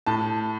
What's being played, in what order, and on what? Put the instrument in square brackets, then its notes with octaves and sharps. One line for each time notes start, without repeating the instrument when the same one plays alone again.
[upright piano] A2 A5